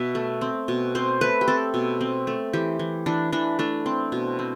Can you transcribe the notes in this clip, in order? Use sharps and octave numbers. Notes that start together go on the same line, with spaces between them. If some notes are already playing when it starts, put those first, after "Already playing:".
Already playing: B2 E5
A3
C4
B2
C4 C5
A3 B4
G4
C4 A4
B2
C4
A3
E3 G4
E3
E3 D4
E3 D4
A3 D4
C4
B2
C4